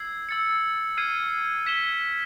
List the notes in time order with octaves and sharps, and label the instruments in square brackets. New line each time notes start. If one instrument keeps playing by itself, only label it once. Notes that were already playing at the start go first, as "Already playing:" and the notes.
Already playing: [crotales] E6 G#6 C7
E6 A6 C#7
F6 G#6 C7 D#7
G#6 B6 E7 G7